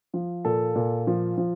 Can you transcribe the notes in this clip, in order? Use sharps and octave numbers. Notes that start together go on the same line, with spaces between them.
F3
A#2 A4
A#2
F3
F3